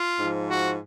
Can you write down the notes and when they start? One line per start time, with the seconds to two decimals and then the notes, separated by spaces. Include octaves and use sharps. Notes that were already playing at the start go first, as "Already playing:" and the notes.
Already playing: F4
0.18 G#2 F3
0.48 F#4